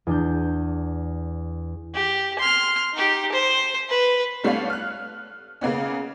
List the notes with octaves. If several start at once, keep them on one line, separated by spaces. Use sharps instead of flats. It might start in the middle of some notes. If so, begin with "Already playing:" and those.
E2 D4 G6
G4
C6 F6
D#4 G4
C5
B4
G3 A3 B3 D4 C#5 F5
F6 F#6
C#3 A#3 B3 C#4